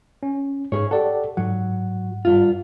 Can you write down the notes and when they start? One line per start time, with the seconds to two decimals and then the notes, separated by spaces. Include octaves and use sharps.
0.23 C#4
0.72 G#2 G#4 C#5
0.91 G4 A4 D5 F#5
1.37 G#2 F#3 F#5
2.25 G2 F4